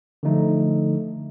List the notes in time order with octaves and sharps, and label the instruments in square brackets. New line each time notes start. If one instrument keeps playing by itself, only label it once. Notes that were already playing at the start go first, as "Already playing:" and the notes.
[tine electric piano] D3 F3 A3 D#4